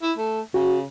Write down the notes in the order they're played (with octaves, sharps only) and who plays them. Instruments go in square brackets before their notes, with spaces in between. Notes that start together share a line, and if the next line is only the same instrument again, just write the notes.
[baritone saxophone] E4
A3
[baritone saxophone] C#3 [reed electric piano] F#4